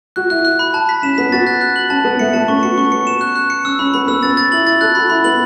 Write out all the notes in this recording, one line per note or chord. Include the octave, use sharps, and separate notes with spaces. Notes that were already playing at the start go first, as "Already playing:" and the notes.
F#4 F#6
E4 F#6
F#6
B5
A5
B6
C#4 E7
B3 B6
F#4 A6
F#6
F#6
F#7
C#4 A5
B3 A5
A3 C#7
B3 A5
C#4 C#6
F#4 C#7
C#4 C#6
B3 C#7
E7
F#6
F#6
C#7
C#4 E6
C#4 B5
B3 B5
B3 E6
C#4 A6
A6
E4 F#7
E4 A6
A4 F#6
F#4 B5
E4 B5
B3 F#7